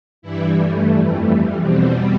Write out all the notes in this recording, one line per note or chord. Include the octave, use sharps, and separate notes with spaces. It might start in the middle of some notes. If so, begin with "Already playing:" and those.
G2 E3 G3 E4
A3
F2 E3 G3
E2 B2 G3 C4